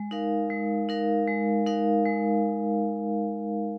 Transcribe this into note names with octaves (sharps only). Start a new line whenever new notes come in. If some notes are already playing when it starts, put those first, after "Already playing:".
Already playing: G#3
D#4 A#4 F5
G#3
D#4 A#4 F5
G#3
D#4 A#4 F5
G#3